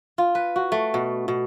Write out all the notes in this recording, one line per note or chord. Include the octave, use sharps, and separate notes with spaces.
F4
B4
F#4
A3
B2
B2